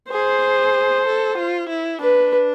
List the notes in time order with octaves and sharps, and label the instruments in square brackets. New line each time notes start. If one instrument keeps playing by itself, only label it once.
[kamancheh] G#4 [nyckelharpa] C5
[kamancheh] A4
F4
E4
[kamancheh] D4 [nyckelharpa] B4